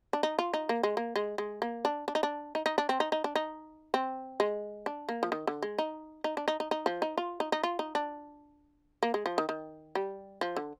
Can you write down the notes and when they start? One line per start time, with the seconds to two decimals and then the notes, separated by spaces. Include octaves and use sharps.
0.13 D4
0.23 D#4
0.39 F4
0.54 D#4
0.69 A#3
0.83 G#3
0.97 A#3
1.16 G#3
1.38 G#3
1.62 A#3
1.85 D4
2.08 D4
2.15 D#4
2.23 D4
2.55 D#4
2.66 D#4
2.78 D4
2.89 C4
3.00 D#4
3.12 D#4
3.24 D4
3.35 D#4
3.94 C4
4.40 G#3
4.86 D4
5.09 A#3
5.23 F3
5.32 D#3
5.47 D3
5.62 G#3
5.79 D#4
6.24 D#4
6.37 D4
6.48 D#4
6.60 D#4
6.71 D#4
6.86 F3
7.02 D#4
7.18 F4
7.40 D#4
7.52 D#4
7.63 F4
7.79 D#4
7.95 D4
9.03 A#3
9.14 G#3
9.26 F3
9.38 D#3
9.49 D#3
9.95 G3
10.41 F3
10.56 D3